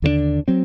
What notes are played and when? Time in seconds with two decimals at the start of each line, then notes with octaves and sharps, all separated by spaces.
0.02 D#2 D3 A3 D4
0.48 F#3 C4